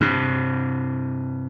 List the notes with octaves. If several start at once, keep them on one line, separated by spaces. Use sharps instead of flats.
G2 C3